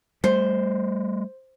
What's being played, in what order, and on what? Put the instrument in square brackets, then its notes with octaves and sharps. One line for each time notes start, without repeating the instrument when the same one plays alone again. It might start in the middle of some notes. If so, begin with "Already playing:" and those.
[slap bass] G3 A3 [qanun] C5